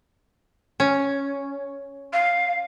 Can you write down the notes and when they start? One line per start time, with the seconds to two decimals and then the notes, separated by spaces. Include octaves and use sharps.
0.80 C#4
2.13 F5